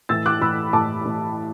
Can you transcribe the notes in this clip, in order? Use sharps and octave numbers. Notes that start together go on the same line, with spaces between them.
A2 E3 E6 A6
D6 F#6
A2 E3 B5 E6
A2 E3 A5 D6
A2 E3